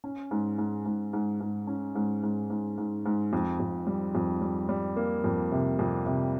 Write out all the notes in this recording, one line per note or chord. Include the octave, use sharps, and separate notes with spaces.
C#4
G#2
G#2
G#2
G#2
G#2
C#4
G#2
G#2
G#2
G#2
G#2
F2
F2
G3
F2
G3
G3
A#3
F2
C3
F2
C3